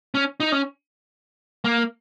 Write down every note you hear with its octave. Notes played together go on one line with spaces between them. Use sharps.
C#4
D#4
C#4
A#3